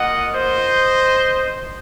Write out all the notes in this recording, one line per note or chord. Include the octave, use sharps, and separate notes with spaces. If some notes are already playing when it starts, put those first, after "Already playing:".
Already playing: A#3 F4 D#5 F#5
C5 D#5